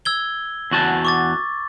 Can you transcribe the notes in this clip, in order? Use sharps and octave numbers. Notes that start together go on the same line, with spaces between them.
E6 G#6 G7
E2 F#4 A5
C#6 D6 A6